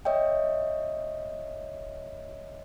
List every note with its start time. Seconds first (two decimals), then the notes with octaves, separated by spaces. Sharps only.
0.05 C#5 D#5 E5 G5